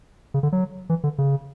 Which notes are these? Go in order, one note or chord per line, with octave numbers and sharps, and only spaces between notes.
C#3
D3
F#3
E3
D3
C#3